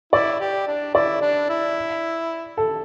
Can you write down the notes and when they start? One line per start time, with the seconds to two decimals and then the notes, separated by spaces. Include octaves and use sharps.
0.13 E4 D5
0.41 G4
0.67 D4
0.95 E4 D5
1.22 D4
1.49 E4
2.57 A4